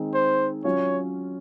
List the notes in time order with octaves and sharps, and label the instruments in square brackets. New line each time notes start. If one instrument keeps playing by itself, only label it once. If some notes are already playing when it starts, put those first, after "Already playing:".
Already playing: [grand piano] D#3 G#3 C4 D#4 G#4
[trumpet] C5
[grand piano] F#3 C#4 F4 [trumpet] C#5